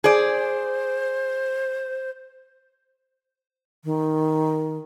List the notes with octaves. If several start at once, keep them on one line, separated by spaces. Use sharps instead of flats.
G#4 C5 D5
D#3